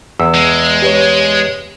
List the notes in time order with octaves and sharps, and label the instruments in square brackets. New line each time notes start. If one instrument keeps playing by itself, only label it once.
[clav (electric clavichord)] E2 [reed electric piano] E6
[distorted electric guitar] G#3
[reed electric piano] G4 B4 C#5